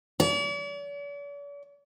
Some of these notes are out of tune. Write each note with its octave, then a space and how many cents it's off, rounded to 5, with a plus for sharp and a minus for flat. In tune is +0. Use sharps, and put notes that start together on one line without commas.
D5 -45